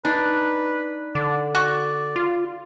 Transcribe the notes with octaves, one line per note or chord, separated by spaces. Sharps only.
D4 D#4 B4
D3 D5
F#4 D5 C#6
F4